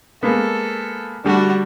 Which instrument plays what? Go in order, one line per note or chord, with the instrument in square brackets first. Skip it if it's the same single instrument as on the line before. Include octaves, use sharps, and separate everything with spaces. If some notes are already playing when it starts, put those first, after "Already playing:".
[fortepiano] G#3 A#3 B3 [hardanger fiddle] A4
[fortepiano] D3 G3 A3 [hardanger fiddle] D4 F#4